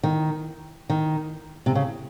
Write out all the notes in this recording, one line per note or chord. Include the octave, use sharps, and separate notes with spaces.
D#3
D#3
C3
C#3